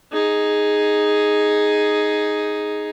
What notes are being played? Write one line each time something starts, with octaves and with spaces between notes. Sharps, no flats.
D#4 G#4